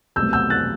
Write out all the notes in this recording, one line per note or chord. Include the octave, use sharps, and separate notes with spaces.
C2 B2 F#3 A3 E6 G6
E6 G6
F#6 A6